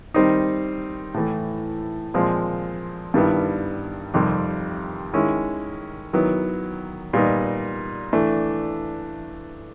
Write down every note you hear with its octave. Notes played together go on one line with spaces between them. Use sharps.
D#3 G3 C4 D#4
A2 E3 A3
A#2 F3 G#3 C4
G2 D#3 G3 B3 E4
F2 C3 D#3 G3
D#3 G#3 C#4 E4
D#3 F#3 B3 E4
A#2 G3 B3 D#4
E3 A3 D4